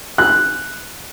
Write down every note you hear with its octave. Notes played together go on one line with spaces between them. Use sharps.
F#6